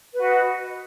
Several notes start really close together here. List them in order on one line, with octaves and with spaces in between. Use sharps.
B4 F#4 D#5